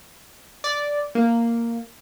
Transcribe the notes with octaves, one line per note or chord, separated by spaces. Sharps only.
D5
A#3